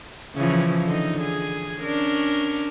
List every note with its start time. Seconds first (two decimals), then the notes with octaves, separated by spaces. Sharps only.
0.36 C#3 E3 F3
0.85 D3 D#4
1.21 G#4
1.82 C#4 D4 A#4